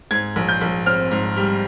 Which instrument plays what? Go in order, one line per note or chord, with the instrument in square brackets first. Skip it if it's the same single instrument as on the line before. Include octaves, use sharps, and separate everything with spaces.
[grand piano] G#2 G#6
A#1
G6
A#1
C4 F6
G#2
G3